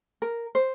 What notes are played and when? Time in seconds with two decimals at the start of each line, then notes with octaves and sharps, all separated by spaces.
0.22 A#4
0.55 C5